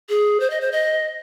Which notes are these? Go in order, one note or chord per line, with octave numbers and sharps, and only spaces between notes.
G#4
C5
D#5
C5
D#5